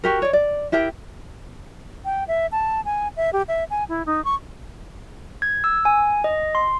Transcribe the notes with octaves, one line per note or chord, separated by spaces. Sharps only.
F#4 G4 A#4
C#5 D5
D5
E4 G4 A#4 G5
G5
E5
A5
G#5
E5
G4
E5
G#5
E4
D#4
C#6
G#6
E6
G#5
D#5
C6